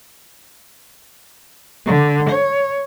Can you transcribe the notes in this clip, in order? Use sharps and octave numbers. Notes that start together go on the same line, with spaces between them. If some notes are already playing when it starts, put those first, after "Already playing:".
D3
C#5